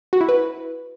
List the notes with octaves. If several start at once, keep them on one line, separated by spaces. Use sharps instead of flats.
F#4
E4
B4